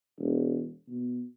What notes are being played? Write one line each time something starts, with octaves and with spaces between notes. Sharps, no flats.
E1
B2